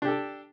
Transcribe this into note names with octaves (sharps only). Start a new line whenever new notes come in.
D4 G4 A4